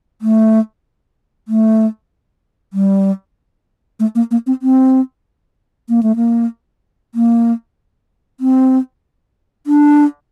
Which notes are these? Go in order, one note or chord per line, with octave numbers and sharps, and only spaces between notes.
A3
A3
G3
A3
A#3
A#3
C4
C4
A#3
A3
A#3
A#3
C4
D4